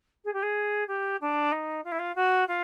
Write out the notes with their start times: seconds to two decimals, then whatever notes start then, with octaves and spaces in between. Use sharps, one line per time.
0.25 G#4
0.33 G4
0.43 G#4
0.88 G4
1.21 D4
1.52 D#4
1.84 F4
1.92 E4
1.99 F4
2.15 F#4
2.48 F4